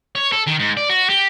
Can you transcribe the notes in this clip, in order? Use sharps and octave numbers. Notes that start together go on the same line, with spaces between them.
C#5
A4
D#3
G#2
D5
F#4
G4